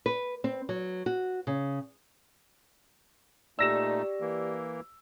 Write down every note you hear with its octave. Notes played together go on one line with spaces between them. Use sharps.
B4
C4
F#3
F#4
C#3
A#2 A3 D#4 G4 D5 E6 A#6 E7
E3 A#3